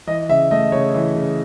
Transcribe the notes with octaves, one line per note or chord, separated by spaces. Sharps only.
E3 D#5
C#3 E5
A3 D#5
C#3 C#5
E3
C#3